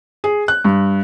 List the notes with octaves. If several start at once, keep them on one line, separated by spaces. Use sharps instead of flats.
G#4
F#6
G2